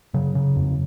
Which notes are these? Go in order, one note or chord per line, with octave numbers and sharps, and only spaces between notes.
C#3 F#3
C#3
F2